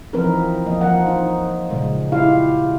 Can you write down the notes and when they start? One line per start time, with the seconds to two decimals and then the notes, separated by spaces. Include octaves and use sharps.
0.13 E3 F3 C4 D#4 A#4 B4
0.66 F3 A#3 D#5
0.81 F3 A#4 F#5
1.07 D#4
1.71 A#2 C#3 G#3
2.12 E4 F4 G4 F5